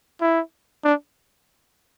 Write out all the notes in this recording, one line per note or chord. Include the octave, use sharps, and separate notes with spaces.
E4
D4